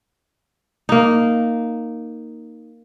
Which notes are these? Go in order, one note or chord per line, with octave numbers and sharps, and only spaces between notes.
A#3 D#4